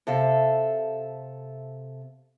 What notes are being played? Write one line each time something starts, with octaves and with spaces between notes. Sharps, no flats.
C3 A4 E5 F5